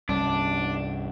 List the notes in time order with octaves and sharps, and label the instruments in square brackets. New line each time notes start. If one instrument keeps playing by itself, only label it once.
[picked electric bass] C2 G2 C#4 [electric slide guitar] D4